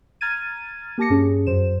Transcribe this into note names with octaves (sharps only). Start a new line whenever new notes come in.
A#5 F6 G#6 A6 D#7
A#3 G4 A5 D6 A#6 C#7
G2 C#4 G#4
F#2 C5 E7